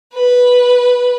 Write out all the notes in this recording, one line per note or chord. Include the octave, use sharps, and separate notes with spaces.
B4